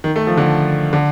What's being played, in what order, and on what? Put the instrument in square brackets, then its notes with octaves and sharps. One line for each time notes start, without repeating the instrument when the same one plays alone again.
[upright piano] D#3
A3
F3
D3
D3